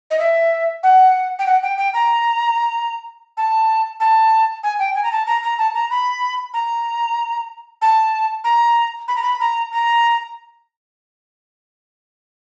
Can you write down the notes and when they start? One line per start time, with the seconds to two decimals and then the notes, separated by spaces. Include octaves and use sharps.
0.11 D#5
0.19 E5
0.83 F#5
1.39 G5
1.46 F#5
1.63 G5
1.78 G5
1.94 A#5
3.37 A5
4.00 A5
4.63 G#5
4.79 G5
4.95 G#5
5.03 A#5
5.12 A5
5.27 A#5
5.43 A#5
5.58 A5
5.74 A#5
5.91 B5
6.54 A#5
7.82 A5
8.44 A#5
9.08 B5
9.16 A#5
9.22 B5
9.40 A#5
9.72 A#5